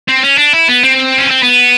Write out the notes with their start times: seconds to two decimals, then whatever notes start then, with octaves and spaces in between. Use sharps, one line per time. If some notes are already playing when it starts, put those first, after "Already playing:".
0.09 C4
0.23 C#4
0.38 D4
0.53 E4
0.68 B3
0.83 C4
1.18 C#4
1.31 C4
1.43 B3